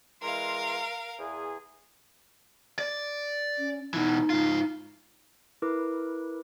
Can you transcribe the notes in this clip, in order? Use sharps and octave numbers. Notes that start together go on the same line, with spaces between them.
E3 G#3 A#4 F5 C6
E2 G#4
D5
C#4
B2 E3 D#4
G#2 F4
E4 A#4 B4 D6